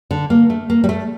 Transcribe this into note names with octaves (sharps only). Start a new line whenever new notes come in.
D3
A#3
A3
A#3
G3
A3